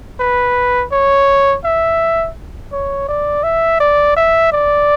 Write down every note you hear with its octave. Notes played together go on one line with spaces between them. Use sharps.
B4
C#5
E5
C#5
D5
E5
D5
E5
D5